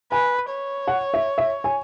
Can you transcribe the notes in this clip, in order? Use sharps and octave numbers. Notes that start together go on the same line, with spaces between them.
B4 G#5
C#5
F#5
E5
E5
G#5